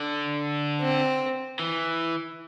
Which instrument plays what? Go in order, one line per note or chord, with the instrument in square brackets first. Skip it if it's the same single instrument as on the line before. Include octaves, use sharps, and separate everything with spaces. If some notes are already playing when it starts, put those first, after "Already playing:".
Already playing: [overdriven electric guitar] D3
[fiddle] C4
[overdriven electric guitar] E3